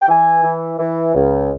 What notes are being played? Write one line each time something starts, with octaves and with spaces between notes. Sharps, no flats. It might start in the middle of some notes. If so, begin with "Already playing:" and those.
G5
E3 G#5
E3
E3
C#2